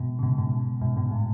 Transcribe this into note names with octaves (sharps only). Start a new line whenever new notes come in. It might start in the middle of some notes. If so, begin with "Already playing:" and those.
Already playing: G#2 B2
C#3
G#2 B2
G#2 B2
G#2 B2
G#2 B2
A2